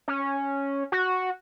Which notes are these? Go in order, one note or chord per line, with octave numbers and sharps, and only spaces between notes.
C#4
F#4